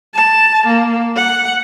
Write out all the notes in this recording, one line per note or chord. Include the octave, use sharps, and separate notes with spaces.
A5
A#3
F#5